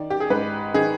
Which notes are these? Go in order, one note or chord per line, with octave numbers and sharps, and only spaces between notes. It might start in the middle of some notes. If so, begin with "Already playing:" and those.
Already playing: D#3 D5
G4
G#4
G#2 B4
D#3 G#4